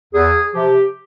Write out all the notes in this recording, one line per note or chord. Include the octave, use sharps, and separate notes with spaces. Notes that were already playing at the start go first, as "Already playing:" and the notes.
E2 G#4
C3 F3 G4